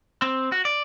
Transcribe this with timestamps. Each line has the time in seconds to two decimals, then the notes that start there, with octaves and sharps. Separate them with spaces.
0.22 C4
0.52 F#4
0.65 D5